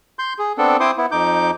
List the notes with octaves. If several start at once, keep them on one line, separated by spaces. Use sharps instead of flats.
C6 G6
G#4
B3 C4 D4 A4
C4 E4 C5 C6 D6 D#6
B3 E4
F2 D#4 D6 G6